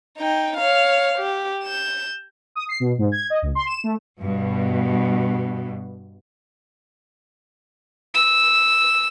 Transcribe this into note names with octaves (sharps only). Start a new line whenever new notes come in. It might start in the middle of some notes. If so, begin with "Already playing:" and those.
D#4 G5
C#5 F5
G4
G6 E7
D#6
C7
B2
G#2
G#6
D#5
C#2
C6
E7
A3
G2 B2
E6